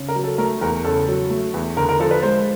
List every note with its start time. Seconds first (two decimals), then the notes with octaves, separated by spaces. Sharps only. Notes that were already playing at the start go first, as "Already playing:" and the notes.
Already playing: C#3
0.09 A#4
0.16 F#3
0.24 A4
0.38 A3 A#4
0.61 E2 A#4
0.85 C#3 A4
1.08 F#3
1.30 A3
1.54 E2
1.77 D3 A#4
1.89 A#4
2.00 F3 A4
2.11 B4
2.22 G#3 C5